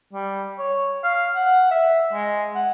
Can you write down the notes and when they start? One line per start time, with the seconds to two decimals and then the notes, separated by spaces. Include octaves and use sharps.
0.13 G3
0.59 C#5
1.04 F5
1.35 F#5
1.71 E5
2.13 G#3
2.55 F#5